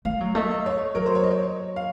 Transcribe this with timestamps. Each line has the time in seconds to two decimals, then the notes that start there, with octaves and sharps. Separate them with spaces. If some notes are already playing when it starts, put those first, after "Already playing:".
0.05 A3 F5
0.20 F#3
0.35 A3 D#5
0.51 D#5
0.66 C#5
0.95 F#3 A#4
1.06 C5
1.15 C#5
1.24 D#5
1.31 C#5
1.76 F5